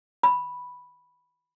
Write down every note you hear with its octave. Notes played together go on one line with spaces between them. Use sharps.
B5